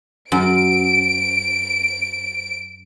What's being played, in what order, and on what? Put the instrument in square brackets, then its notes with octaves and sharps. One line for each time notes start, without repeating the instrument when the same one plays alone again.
[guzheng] F#2 [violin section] D7